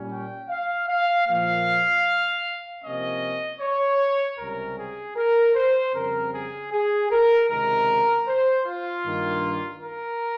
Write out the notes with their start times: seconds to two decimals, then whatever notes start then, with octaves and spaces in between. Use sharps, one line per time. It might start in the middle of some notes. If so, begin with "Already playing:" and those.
Already playing: A#2 G3 C#4
0.12 G5
0.50 F5
0.88 F5
1.27 A#2 F3 A#3 F5
2.83 C3 F3 A#3 C#4 D#5
3.61 C#5
4.39 C#2 C3 G3 C#4 A#4
4.78 G#4
5.17 A#4
5.55 C5
5.94 F2 C#3 G3 C4 A#4
6.33 G#4
6.72 G#4
7.11 A#4
7.50 C#2 C3 D#3 G#3 A#4
8.27 C5
8.66 F4
9.05 G2 D#3 A#3
9.83 A#4